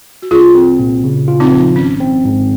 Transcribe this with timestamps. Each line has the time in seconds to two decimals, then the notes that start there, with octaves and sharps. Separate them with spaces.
0.22 F#4
0.31 C2 F4 G#4
0.55 C4
0.79 A#2
1.04 C#3
1.28 F4
1.40 C4 D#4
1.52 F3
1.76 G#1 C#4
2.00 C4
2.25 G#2